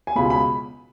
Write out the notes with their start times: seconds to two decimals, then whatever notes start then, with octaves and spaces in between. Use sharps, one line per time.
0.07 G#5
0.15 C#2 B2 G#3 B5
0.30 B5